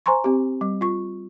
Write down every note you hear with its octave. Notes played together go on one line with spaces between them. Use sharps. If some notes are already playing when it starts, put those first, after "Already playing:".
C5 G#5 A#5 C6 C#6
C4 G4
G3
F4 C#6